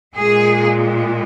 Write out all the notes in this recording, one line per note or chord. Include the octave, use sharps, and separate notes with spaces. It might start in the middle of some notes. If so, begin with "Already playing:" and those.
A#2 G#3 G#4